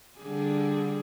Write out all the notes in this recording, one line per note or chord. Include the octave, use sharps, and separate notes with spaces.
D3 G3 G#4